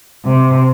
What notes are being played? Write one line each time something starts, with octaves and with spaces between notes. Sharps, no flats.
C3